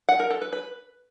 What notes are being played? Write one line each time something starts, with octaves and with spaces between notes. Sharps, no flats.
F#5
A#4
A4
B4
B4